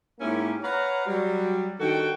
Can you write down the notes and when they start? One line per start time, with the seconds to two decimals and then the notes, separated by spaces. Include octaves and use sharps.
0.19 G#2 A#3 C#4 E4 G4
0.63 B4 C#5 F5 F#5 A#5
1.06 F#3 G3
1.79 G2 D#3 F#4 A4 G5